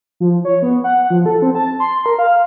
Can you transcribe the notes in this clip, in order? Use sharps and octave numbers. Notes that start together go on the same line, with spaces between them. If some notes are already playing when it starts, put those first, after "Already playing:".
F3
C#5
B3
F#5
F3
A4
C4
A5
C6
A#4
F5